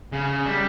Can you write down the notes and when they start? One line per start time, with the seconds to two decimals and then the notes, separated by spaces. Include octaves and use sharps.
0.12 C#3
0.46 G3